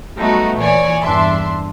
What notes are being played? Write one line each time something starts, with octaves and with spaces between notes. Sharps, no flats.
F#3 G3 A3 B3 D#4 F#4
A#2 E3 C#5 D5 G#5
E2 G2 D4 E5 C6